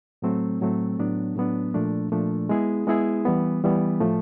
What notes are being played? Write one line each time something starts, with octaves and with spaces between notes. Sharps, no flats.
A2 F#3 A3 C4
A2 F#3 A3 C4
A2 F#3 B3 D4
A2 F#3 B3 D4
A#2 F3 A3 D4
A#2 F3 A3 D4
G#3 B3 E4 G#4
G#3 B3 E4 G#4
E3 G3 B3
E3 G3 B3
A2 F3 A3